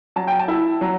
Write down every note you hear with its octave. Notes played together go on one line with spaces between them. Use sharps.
F#3 A5
G5
A5
E4
F#3